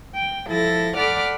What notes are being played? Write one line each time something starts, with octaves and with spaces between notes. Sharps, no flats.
G5
F3 E4 A4 A6 A#6
A4 D5 F#5 B5 D6 F6